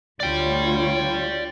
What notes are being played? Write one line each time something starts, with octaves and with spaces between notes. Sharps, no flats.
D2 F4 C#5 D5 G5